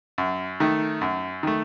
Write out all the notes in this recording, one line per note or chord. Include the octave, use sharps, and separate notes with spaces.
F#2
D#3 A3
F#2
D#3 A3